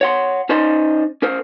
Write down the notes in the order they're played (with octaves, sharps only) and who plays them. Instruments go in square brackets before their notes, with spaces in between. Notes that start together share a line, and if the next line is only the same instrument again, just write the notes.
[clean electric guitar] C#5 F#5 C6
C#4 D#4 C5 D5 D#5 C6
C#4 A#4 C5